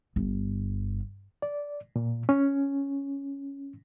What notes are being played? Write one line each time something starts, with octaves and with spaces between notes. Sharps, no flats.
G1
D5
A#2
C#4